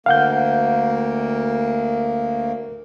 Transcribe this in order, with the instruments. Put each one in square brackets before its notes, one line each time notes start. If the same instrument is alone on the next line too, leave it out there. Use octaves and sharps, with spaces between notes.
[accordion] D2 A#3 [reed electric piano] F5 F#5 G6